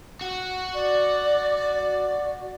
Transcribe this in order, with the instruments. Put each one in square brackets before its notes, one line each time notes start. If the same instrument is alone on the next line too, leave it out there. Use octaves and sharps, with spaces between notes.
[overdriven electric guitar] F#4
[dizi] D5